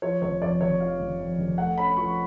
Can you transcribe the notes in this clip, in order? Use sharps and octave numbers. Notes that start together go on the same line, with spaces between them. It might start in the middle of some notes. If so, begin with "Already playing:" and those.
F3 C#5
F1 C#5
F2 D5
F1 C#5
F3 F5
F1
F2
F1
A3 F#5
C#4 B5
F3 C#6